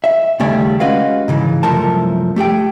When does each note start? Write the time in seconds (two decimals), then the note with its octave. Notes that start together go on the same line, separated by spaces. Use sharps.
0.04 E5
0.40 D#2 C#3 G3 A3 D5 G#5
0.80 G#3 C#4 F#4 B4 D#5 F5
1.28 G#2 C#3 E3
1.63 C2 F#2 F3 A3 A#4 A5
2.36 A3 G4 G#4 G5